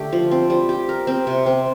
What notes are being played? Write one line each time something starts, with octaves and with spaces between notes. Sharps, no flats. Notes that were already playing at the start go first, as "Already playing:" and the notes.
Already playing: D3 A3 D4 G4
F3
C4
G3
G4
A#4
C4
C3
C4